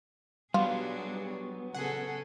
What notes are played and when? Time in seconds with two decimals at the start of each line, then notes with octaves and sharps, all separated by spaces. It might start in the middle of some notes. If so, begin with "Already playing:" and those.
0.54 F#3 G3 B3 D4 F4 F#4 G#4
1.74 C#3 G#4 A4 F#5